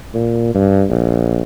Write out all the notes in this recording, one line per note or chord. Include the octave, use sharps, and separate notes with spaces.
A#2
G2
A#1